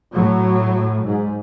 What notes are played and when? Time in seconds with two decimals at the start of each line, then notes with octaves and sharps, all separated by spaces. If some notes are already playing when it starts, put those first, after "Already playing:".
0.14 A2 F#3
1.05 G#2